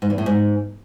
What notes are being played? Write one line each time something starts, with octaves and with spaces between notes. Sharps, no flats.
G#2
E2
A2
G#2